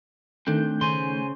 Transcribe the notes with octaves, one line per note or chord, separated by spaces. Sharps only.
D#3 A3 C4 D4 G6
C#3 C5 G#5 C6